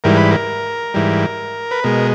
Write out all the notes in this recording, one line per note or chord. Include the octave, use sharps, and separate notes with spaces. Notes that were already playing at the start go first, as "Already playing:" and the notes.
G#2 E3 G3 A#4
B4
A#4
G#2 E3 G3
B4
B2 G#3 A#4